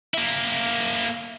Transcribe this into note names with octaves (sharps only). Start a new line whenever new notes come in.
A#3 E4